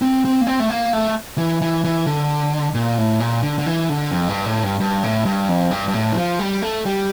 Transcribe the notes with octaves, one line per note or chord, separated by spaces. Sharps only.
C4
C4
A#3
C4
A3
A#3
A3
E3
E3
E3
D3
A#2
A2
A#2
D3
D3
E3
D3
F2
G2
A2
G2
G2
A2
G2
F2
G2
G2
A2
E3
F3
G3
A3
G3